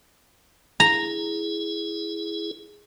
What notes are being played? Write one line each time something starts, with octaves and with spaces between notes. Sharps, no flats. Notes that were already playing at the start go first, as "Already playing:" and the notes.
E4 G#4 A#5